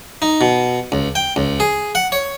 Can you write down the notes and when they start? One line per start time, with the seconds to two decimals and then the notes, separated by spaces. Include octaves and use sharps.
0.22 D#4
0.41 B2
0.92 C#2
1.15 G5
1.36 C#2
1.60 G#4
1.95 F#5
2.12 C#5